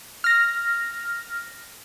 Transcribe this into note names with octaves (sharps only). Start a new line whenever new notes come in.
F6 A#6